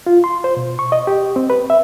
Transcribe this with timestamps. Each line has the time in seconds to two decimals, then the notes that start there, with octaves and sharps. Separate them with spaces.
0.07 F4
0.24 C6
0.44 C5
0.57 B2
0.79 C#6
0.92 D#5
1.07 G4
1.36 C4
1.50 B4
1.70 E5